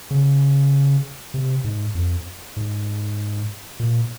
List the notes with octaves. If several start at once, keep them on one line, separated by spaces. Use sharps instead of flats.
C#3
C3
G#2
F2
G#2
A#2